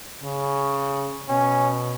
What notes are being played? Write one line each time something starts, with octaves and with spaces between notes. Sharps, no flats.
C#3
B2 C#4